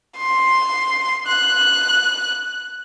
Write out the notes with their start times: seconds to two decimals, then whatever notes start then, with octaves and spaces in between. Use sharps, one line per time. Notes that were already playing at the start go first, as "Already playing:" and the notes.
0.17 C6
1.27 F#6